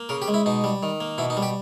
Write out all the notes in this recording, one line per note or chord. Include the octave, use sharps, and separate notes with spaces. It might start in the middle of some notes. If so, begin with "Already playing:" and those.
Already playing: A#3
C#3 A#4
G4
G#3
E4
B2 D#4
G3
D#3
A#3
B2 E4
D#4
G3
G4